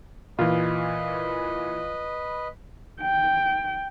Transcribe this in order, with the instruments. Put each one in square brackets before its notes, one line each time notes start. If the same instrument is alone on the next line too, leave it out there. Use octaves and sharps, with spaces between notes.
[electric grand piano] A#2 E3 [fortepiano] F4 [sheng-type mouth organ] B4 D#5 B5
[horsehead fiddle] G5